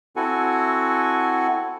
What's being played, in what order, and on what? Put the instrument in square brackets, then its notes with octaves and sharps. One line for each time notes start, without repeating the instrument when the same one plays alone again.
[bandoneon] C4 E4 F#4 A4 F#5 G#5